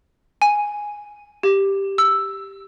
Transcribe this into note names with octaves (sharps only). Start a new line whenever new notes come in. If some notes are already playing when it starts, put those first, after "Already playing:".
G#5
G4
E6